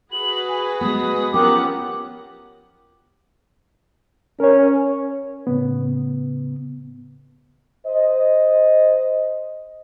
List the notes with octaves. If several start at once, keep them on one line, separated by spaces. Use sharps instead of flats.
F#4 G#4 B4 F#7
G#5
G#3 B3 D#6
F3 B3 C#4 G4 A#4 F#5 D6
C#4 A#4 C#5
A2 C#3 B3
C5 D#5